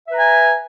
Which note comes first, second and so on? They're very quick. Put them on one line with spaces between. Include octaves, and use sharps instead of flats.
E5 B4 A#5 G#5